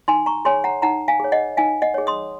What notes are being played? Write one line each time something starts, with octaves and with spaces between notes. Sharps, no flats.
D#4 G#5 C6
A#5 C#6
G#4 C#5 G#5 C6
F#5 A#5
D#4 F#5 A#5
F5 G#5
G#4 C#5
D#5 F#5
D#4 F5 G#5
D#5 F#5
G#4 C#5
C6 D#6